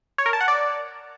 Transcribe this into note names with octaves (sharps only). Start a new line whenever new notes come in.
C#5
A#4
A5
F#5
D5